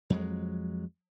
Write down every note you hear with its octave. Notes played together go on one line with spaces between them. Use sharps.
F2 F#3 G#3